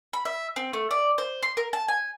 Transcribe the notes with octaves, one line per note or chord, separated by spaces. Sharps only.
B5
E5
C4
A3
D5
C5
C6
A#4
A5
G#5